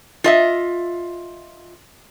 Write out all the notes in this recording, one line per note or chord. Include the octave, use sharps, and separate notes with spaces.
F4 D#5 E5